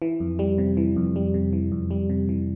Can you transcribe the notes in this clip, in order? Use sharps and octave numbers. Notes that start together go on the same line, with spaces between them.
E3
F2
G3
C3
E3
F2
G3
C3
E3
F2
G3
C3
E3